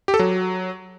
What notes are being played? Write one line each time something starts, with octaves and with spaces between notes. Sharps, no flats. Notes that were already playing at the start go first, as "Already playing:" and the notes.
G4
A4
F#3